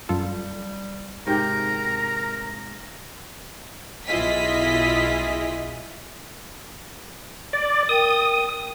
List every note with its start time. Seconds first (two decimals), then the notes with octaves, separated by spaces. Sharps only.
0.09 F#2 G3 F4 A4
1.27 G#2 C3 G4 A#4 A#5
4.06 B1 E4 F4 G#4 D#5 B6
7.53 D5
7.89 A#4 G5 D#6